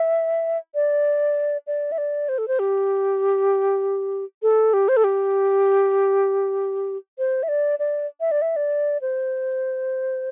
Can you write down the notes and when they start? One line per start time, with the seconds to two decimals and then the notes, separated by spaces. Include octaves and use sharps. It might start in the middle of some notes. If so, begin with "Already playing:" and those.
Already playing: E5
0.75 D5
1.67 D5
1.92 E5
1.98 D5
2.29 C5
2.38 A4
2.48 C5
2.59 G4
4.43 A4
4.73 G4
4.89 C5
4.97 A4
5.04 G4
7.18 C5
7.43 E5
7.48 D5
7.79 D5
8.20 E5
8.31 D5
8.42 E5
8.56 D5
9.02 C5